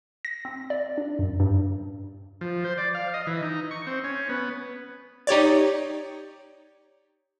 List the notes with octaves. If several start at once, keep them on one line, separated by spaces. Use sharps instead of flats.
A#6
C4
D5
D4
F#2
G2
F3
C5
D5
F5
D#5
E3
D#4
C#6
C4
C#4
B3
D#4 G4 C#5 D5